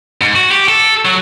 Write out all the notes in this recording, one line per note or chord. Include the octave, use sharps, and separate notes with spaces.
G#2
F#4
G4
A4
F#3